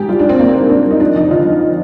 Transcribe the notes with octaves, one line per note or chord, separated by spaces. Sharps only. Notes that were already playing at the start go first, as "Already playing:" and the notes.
Already playing: G#2 G4 G#4
G3 F4
D4
G3
C4
G#2 A#3
G3 C4
G#2 D4
G3
D#4
F3 D4
F2 D#4
D3 F4
F2